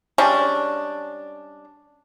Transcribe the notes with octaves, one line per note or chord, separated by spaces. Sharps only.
G3 G#3 C#4 D4